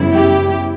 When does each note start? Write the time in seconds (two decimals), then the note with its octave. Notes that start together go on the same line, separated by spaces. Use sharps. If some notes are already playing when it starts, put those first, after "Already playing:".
Already playing: F#2 C#3 G3 B3 E4
0.12 G4